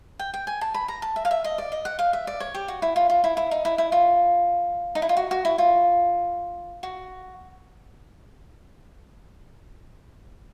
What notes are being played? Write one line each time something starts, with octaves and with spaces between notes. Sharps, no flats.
G5
G5
G#5
A5
B5
A#5
A5
E5
F5
E5
D#5
D5
D#5
F#5
F5
E5
D5
C#5
G4
F#4
E4
F4
F4
E4
E4
D#4
E4
E4
F4
D#4
E4
F4
F#4
F#4
E4
F4
F#4